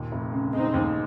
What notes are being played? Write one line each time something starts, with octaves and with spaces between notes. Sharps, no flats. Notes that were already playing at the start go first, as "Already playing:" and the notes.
Already playing: D#2 A#2
F1
C#3
G#3 C4 D#4
D#2